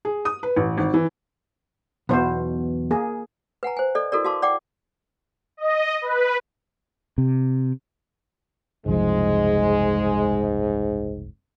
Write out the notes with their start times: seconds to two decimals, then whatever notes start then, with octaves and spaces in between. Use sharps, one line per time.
0.05 G#4
0.25 D#6
0.43 B4
0.56 A1
0.78 G#1
0.94 E3
2.09 B1 E2 B2 B3 C5
2.91 A#3 G#4
3.63 B4 F#5 G#5 A#5
3.77 C5 G#5
3.95 A4 D5 D#5
4.12 E4 F#4 A4 A#4 D5
4.25 F#4 F5 A5 C6 D6
4.42 D5 F#5 G5 D6
5.57 D#5
6.02 B4
7.18 C3
8.86 F#1 C2 G#2 F3 G#3